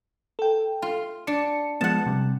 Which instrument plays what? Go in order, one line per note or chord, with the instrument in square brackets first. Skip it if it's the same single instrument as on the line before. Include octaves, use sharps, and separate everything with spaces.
[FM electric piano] A4 G5
[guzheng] F4
[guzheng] D4 [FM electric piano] C#7
[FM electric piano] F3 G#3 B3 [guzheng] F#5 A5
[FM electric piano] C3 G3